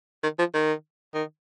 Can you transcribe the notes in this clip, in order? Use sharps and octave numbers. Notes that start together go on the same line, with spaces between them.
D#3
F3
D#3
D#3